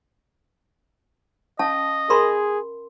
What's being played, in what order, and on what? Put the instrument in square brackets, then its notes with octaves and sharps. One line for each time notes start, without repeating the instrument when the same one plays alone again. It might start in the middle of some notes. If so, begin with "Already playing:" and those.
[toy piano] C#4 F5 A5 [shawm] D#5
[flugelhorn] G#4 [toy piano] A#4 B5 C6